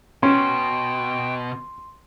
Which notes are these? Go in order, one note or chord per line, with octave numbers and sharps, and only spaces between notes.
B2 C#4 G5 C6